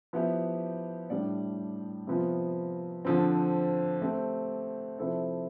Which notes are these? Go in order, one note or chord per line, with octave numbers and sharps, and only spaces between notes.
F3 B3 E4 G4
A2 G3 D4 G4 D5
C3 F3 B3 F4
D3 F3 C4
A3 C4 G4
C3 F3 C4 E4 A4